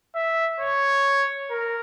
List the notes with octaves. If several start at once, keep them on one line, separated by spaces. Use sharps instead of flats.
E5
C#5
A#4